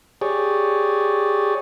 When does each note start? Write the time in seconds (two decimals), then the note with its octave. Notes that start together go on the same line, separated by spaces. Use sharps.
0.21 G4 G#4 C#5 D5